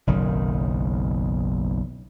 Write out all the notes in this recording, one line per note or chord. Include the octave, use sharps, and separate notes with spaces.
F#1 B1 D#3